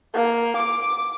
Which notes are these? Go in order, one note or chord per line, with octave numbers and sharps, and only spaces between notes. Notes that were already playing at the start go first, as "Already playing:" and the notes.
A#3
D6